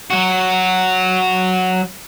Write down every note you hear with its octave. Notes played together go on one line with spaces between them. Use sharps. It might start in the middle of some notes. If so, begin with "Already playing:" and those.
F#3 F#4